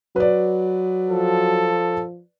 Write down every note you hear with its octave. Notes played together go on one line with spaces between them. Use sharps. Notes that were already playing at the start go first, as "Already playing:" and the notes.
F#3 B4 D5
F3 A4